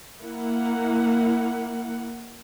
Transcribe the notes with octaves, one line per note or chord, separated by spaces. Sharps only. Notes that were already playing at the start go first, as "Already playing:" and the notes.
A#3 E4 F#5